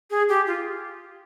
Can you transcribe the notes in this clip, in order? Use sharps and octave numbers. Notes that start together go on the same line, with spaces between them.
G#4
G4
F4